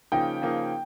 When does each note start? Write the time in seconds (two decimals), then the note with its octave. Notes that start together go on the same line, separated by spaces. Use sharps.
0.12 C#3 F3 A#3 D#4 G5
0.41 C#3 F3 A#3 D#4